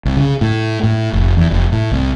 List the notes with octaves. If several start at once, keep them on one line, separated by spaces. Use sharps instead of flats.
C2
C#3
A2
A2
F1
E2
F1
A2
C2